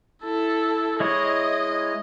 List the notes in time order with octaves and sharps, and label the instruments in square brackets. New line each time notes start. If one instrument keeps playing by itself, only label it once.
[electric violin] E4 A4
[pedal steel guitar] G#3 E4 C#5 [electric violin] D#5